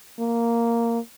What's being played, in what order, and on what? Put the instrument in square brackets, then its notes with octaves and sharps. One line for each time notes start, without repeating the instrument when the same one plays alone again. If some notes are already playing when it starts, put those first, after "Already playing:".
[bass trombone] A#3